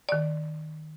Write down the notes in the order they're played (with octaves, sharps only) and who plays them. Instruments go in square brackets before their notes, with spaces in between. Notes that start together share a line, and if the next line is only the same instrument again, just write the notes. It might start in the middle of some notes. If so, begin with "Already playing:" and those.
[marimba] D#3 D5